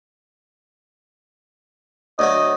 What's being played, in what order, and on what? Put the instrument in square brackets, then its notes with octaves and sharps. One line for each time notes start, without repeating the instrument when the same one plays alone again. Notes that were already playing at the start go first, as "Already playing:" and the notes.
[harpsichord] D2 F#3 A3 [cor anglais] D#5